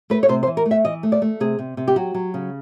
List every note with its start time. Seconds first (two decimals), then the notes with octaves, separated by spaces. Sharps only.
0.10 A3 B4
0.23 C#5
0.29 C3 C5
0.43 C5
0.47 E3
0.57 A#4
0.66 A3
0.71 E5
0.85 E3 D#5
1.03 A3
1.12 D5
1.22 A3
1.40 C3 G#4
1.59 C3
1.77 C3
1.88 G4
1.96 F#3 F#4
2.14 F#3
2.34 C#3